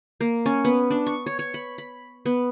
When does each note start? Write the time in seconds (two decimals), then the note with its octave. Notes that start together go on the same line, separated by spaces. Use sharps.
0.20 A#3
0.46 C#4
0.65 B3
0.90 D4
1.06 C#6
1.26 C#5
1.39 C#5
1.54 B5
1.78 B5
2.26 B3